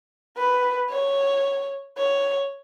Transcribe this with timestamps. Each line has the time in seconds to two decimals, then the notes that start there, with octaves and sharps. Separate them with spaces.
0.37 B4
0.90 C#5
1.97 C#5